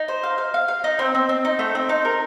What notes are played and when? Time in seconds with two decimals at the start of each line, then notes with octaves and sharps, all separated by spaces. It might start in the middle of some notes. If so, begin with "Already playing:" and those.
Already playing: D#4
0.08 C5
0.23 F5
0.38 F5
0.54 F5
0.68 F5
0.84 D#4
0.99 C4
1.15 C4
1.29 C4
1.45 D#4
1.59 A3
1.75 C4
1.89 D#4
2.05 A#4